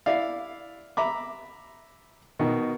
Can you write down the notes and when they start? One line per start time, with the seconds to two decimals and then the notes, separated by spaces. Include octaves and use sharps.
0.06 E4 D5 F5
0.97 E5 A#5 B5 D6
2.39 B2 D#3